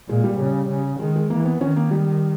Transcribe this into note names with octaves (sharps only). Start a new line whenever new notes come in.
A#2 G#3
G3
C#3
C#3
D#3 G#3
G#3
E3 A#3
B3
D#3 C#4
A#3
G3